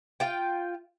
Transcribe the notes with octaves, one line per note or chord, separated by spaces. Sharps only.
F4 G5